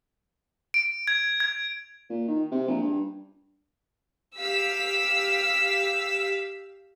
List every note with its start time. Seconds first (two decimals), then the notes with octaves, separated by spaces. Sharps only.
0.74 D7
1.08 G#6
1.40 G#6
2.10 A#2
2.28 D#3
2.51 C3
2.68 A#1
2.82 G2
4.38 G4 F5 E6 B6